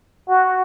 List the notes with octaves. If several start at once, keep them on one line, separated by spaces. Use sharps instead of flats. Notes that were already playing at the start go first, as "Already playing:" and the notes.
F#4